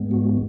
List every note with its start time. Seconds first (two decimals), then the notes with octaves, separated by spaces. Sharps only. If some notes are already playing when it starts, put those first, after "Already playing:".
Already playing: G#2 G#3 B3
0.11 F#4